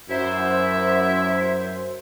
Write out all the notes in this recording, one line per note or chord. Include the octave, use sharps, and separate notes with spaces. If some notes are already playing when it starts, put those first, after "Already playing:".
F#2 E4 C5 E5